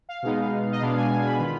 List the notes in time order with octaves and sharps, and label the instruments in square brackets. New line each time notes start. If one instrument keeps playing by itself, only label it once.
[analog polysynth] F5
B2 G#3 B3 D#4
D#5
B2 G#3 B3 D4 F5
G#5
G#5
B5
D#3 B3 F4